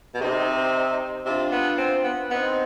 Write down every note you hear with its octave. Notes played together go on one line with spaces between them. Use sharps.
B2
C3 C4 D#4
C3 D4 F4
B3
C4
B3
B3 C4 D#4